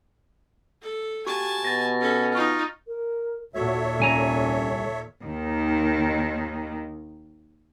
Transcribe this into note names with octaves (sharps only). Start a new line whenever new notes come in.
A4
F#4 G4 G#5 A5 C#6
B2 A6 A#6
C#4 A4
D#4 F4 C#6 F6
A#4
D#2 A#2 F#4 A4 C#5 E5
C2 C#4 G#5 A#5
D#2 D#3